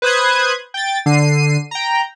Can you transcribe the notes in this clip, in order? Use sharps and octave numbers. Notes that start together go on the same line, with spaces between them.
B4 C5 D#6 F#6 G#6
G5 A6
D3 C7 D#7
G5 A#5